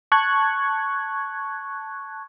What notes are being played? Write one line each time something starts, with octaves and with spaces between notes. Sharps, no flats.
A5 C#6 F#6 G#6